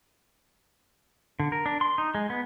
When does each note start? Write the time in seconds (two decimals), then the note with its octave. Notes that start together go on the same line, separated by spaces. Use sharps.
1.40 D3
1.52 A#4
1.66 D4
1.81 C6
1.98 D#4
2.15 G#3
2.30 B3